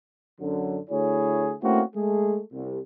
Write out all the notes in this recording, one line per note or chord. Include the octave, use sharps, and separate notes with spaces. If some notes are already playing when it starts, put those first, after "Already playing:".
F#2 D3 F#3
D2 E4 G#4 C#5
A3 A#3 C4 C#4 E4 F#4
G#3 A3 G#4
C2